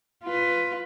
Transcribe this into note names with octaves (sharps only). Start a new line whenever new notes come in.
F4 B4